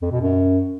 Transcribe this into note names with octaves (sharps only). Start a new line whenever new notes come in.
F2
B2
F#2